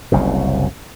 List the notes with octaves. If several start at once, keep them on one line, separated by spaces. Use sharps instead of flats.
F#1 C2 F#2 C#3